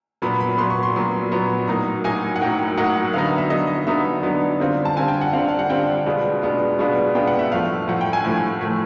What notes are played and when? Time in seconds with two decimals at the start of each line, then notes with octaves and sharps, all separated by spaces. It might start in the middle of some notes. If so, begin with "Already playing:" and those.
0.22 A#2 F#3 B3 B5
0.40 B5
0.58 A#2 F#3 B3 C6
0.70 C#6
0.83 C6
0.94 A#2 F#3 B3
1.31 A#2 F#3 B3
1.67 A2 F#3 A#3 D#4 A#5
2.04 A2 F#3 A#3 D#4 G#5
2.36 F#5
2.41 A2 F#3 A#3 D#4 G5
2.77 A2 F#3 A#3 D#4 F#5
3.13 D3 F#3 B3 D#4 F5
3.26 E5
3.38 E5
3.50 D3 F#3 B3 D#4 D#5
3.87 D3 F#3 B3 D#4 E5
4.23 D3 F#3 B3 D#4
4.60 D3 G3 C4 F4
4.85 A5
4.96 D3 G3 C4 F4 G#5
5.08 G5
5.21 F#5
5.33 D3 G3 C4 F4 F5
5.49 F5
5.59 F#5
5.70 D3 G3 C4 F4 G5
6.06 B2 G#3 B3 D4 F4
6.42 B2 G#3 B3 D4 F4
6.79 B2 G#3 B3 D4 F4
7.15 B2 G#3 B3 D4 F4 G5
7.27 F#5
7.39 E5
7.51 A2 F3 A3 F5
7.88 A2 F3 A3 F#5
8.01 G5
8.13 G#5
8.25 A2 F3 A3
8.61 A2 F3 A3